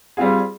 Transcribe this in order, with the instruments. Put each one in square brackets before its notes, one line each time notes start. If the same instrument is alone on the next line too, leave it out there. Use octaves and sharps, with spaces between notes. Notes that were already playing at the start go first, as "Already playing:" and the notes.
[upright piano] G3 C4 F4 G#4